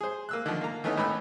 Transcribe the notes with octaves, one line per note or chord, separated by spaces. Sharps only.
G#4 C5
A#3 E6 F#6
D3 D#3 F3
A#3 A#5
D#3 E3 A3 B3 C#4 D#4
G#1 A2 E3 B3 B5 E6